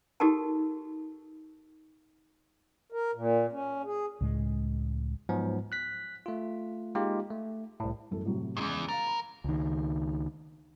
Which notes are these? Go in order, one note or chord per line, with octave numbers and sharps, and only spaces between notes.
D#4 F#4 G4 A4 A#4 A5
A#4
A#2
C#4
G#4
C#2 A2 G#3
G#2 F3 F#3 B3
F#6 B6
A3 F4
G#3 A#3 D#4 F4 G4
A3
C2 A2
A1 F#2 A4
A2 C3 F#3
E2 G#2 C#3 G#3 C#4
A#4 F5 A6
B5
C#2 D#3